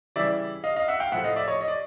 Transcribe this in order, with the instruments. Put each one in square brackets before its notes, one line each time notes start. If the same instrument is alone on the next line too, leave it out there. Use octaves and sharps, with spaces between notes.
[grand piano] C#3 E3 G3 D5 E5
D#5 F5
D#5 F5
E5 F#5
F5 G5
A2 F3 A3 E5 F#5
D#5 F5
D5 E5
C#5 D#5
D#5
D5